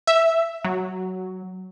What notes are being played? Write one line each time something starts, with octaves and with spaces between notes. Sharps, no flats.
E5
F#3